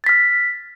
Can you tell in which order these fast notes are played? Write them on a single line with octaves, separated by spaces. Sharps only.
A6 B6 F6